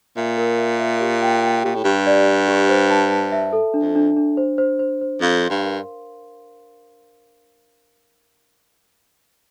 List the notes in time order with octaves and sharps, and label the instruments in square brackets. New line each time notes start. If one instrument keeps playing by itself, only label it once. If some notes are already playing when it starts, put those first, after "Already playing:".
[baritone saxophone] A#2 [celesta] E5
[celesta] A#4
E5
E5
G4
G5
G5
[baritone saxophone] A#2 [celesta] G4
[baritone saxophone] A2
[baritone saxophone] G2 [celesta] G4
[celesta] D5
D5
G4
C5
A5
A5
E5
A4
D4
[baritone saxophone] F2
[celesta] D4
D4
C5
C5
C5
C5
[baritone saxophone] F2 [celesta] F5
[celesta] C6
[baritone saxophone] G2
[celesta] A#4